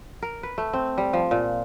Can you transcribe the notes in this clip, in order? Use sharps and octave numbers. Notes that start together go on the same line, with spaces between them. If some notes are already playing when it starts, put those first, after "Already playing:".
A#4
B4
A3
C4
G3
F3
A#2